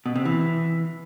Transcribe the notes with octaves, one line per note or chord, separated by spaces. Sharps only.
B2
C3
E3